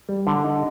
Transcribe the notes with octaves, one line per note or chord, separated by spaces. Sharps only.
G3
D3
D#4